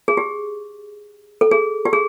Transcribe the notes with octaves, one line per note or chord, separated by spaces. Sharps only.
G#4
G4
A4
G#4
G4
G#4